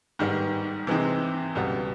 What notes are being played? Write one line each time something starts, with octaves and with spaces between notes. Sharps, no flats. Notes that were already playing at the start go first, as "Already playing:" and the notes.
G#2 D#3 G3 B3
C3 E3 G#3 C4 D#4
C#2 B2 G3 B3